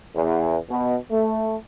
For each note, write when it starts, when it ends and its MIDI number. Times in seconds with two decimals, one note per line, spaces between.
0.15 0.57 40
0.70 0.95 47
1.10 1.56 57